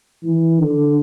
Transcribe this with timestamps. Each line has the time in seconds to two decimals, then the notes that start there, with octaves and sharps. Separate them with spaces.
0.23 E3
0.59 D3